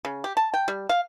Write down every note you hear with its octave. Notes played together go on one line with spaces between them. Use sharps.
C#3
G4
A5
G5
G3
F5